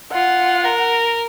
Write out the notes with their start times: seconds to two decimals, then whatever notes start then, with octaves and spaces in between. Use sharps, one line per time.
0.13 F4 F#5
0.64 A#4